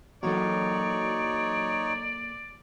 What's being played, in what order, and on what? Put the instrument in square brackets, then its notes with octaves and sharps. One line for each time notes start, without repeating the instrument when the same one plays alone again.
[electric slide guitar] A#2 A4 [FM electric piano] E3 F#3 F#4 [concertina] D#4 C#5 [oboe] D5